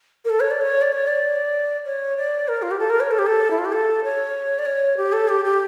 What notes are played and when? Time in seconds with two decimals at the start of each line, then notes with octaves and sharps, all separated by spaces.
0.25 A#4
0.30 A4
0.40 C#5
0.51 D5
0.61 C#5
0.81 D5
0.92 C#5
1.07 D5
1.85 C#5
2.17 D5
2.48 A#4
2.62 F4
2.71 G4
2.79 A4
2.90 A#4
3.00 C#5
3.11 A4
3.19 G4
3.26 A4
3.50 E4
3.58 F4
3.65 G4
3.72 A4
4.04 C#5
4.59 D5
4.66 C#5
4.97 G4
5.12 A4
5.28 G4
5.45 G4